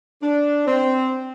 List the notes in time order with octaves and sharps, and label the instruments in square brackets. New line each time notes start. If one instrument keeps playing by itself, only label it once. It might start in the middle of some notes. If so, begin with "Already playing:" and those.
[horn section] D4
C4